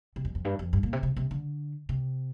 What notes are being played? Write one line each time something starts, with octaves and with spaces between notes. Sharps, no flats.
C3
F2
F2
G2
F2
G2
A#2
C3
C3
C3
D3
C3